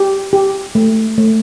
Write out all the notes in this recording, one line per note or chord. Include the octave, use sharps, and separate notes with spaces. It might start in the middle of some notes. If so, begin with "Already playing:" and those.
Already playing: G4
G4
A3
A3